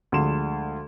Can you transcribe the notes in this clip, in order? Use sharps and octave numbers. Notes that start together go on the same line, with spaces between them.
D2 F3 G#3 C6 E7